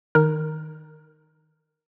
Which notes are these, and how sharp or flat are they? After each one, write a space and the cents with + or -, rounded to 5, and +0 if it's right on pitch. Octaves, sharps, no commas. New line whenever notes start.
D#3 +0 A#4 +0